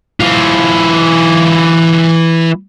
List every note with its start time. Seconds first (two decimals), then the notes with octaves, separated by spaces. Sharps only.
0.20 E3 F4